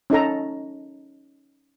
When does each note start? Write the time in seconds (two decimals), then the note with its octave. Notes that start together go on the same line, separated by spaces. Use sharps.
0.10 C#4 D#4 A4 A#5